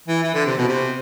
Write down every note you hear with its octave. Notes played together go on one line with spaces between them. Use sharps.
E3
E3
D3
C3
B2
C3